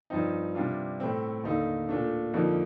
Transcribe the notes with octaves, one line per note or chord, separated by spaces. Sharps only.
G2 F3 C4 D#4
C3 G3 D4 F4
A2 A3 C4
D#2 D3 A3 D#4
A#2 A3 D4
F2 D3 F3 A#3 D#4